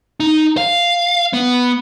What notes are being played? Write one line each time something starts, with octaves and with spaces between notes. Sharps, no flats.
D#4
F5
B3